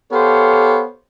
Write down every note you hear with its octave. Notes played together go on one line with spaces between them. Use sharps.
B3 G4 A4 C5 C#5 F5